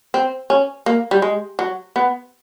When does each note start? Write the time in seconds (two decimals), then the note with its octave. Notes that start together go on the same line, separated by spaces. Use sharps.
0.14 C4
0.50 C#4
0.86 A#3
1.11 G3
1.22 G#3
1.59 F#3
1.96 B3